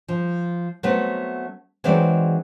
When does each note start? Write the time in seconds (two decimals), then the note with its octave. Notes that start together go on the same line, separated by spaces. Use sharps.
0.08 F3
0.83 F#3 A3 B3 C4 B4
1.84 E3 F#3 G#3 C4 D#4 D5